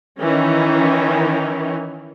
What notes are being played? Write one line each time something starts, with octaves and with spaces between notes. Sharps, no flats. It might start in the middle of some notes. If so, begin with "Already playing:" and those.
D#3 E3 C#4